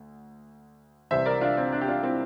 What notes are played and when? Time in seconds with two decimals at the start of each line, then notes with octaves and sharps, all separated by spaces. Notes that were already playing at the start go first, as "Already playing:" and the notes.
Already playing: D2
1.11 C2 C3 E3 C5 E5
1.26 A#4 D5
1.41 D4 F4
1.57 C4
1.72 D4
1.81 G4
1.88 D4 F4
2.03 C4 E4